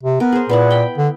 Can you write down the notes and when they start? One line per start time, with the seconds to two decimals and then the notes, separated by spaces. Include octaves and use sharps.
0.03 C3
0.20 B3 A#4
0.32 G#4 C5
0.49 A#2 B3 E4 F#5
0.71 G5 B5
0.98 D3